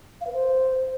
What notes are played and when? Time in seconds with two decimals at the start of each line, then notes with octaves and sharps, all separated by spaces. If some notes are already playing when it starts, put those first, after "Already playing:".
0.21 F5
0.27 B4
0.33 C5